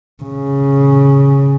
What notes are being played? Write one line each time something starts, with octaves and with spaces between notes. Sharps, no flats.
C#3